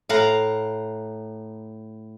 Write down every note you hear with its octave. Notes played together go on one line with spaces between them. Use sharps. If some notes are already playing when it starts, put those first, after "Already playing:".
A2 F5 F#5 A#5